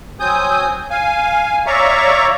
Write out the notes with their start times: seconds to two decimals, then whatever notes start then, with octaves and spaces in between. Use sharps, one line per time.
0.20 F#3 C4 G#5 D#6 G6
0.90 F5 G#5
1.66 C#5 D5 E5 F5 A#5 C#6